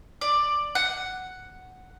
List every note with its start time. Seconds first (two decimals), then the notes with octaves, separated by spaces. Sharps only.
0.21 D5
0.75 F#5